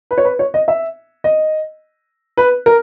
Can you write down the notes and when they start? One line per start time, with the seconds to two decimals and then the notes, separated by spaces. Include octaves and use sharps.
0.11 B4
0.18 C#5
0.25 B4
0.39 C#5
0.54 D#5
0.68 E5
1.24 D#5
2.37 B4
2.66 A#4